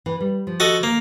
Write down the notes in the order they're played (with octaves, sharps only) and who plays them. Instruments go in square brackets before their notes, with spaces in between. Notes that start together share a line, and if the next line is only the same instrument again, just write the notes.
[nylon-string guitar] E3
G3
F3
[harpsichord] F#4 A4 D#5
A#3